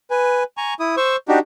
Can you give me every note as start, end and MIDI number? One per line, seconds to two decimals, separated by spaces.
0.10 0.43 71
0.10 0.43 80
0.57 0.74 80
0.57 0.74 82
0.57 0.74 85
0.80 0.96 64
0.80 0.96 87
0.97 1.16 72
0.97 1.16 85
0.97 1.16 88
1.28 1.39 62
1.28 1.39 63
1.28 1.39 66
1.28 1.39 67